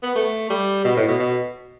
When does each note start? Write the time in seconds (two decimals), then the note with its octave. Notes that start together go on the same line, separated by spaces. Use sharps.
0.03 B3
0.15 A3
0.50 G3
0.84 B2
0.96 A2
1.08 B2
1.19 B2